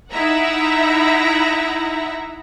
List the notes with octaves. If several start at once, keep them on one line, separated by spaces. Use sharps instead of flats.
D#4 E4 E5 F#5 A#5